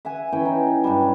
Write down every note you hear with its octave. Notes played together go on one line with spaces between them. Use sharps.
E5 F#5 G#5
E3 C#4 G5
D#4
G2 F#3 G3